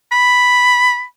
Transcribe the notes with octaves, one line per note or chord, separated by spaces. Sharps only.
B5